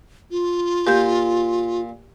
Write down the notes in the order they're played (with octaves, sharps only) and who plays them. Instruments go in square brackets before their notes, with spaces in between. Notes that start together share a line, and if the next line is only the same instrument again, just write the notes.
[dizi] F4
[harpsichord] A#2 [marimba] G4 G6